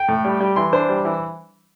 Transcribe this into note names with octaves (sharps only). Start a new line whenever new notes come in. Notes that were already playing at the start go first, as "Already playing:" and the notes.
Already playing: G5
A2
G3
G3
E3 C6
D4 C5
G3
E3